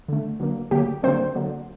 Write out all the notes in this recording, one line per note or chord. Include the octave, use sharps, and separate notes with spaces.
D3 A3
D3 F#3 A#3
D3 F#3 A#3 G4
D3 F#3 A#3 C4 C5
D3 F#3 A#3